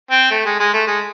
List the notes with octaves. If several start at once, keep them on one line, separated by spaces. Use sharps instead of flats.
C4
A3
G#3
G#3
A3
G#3